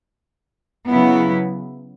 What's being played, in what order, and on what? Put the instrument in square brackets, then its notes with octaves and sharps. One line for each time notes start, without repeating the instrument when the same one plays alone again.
[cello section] C#3 F#3 B3 E4